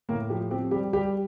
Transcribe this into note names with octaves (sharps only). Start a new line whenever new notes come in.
A2 A#3 A#4
F3 G4
C4 G4
G3 G4
G3 G4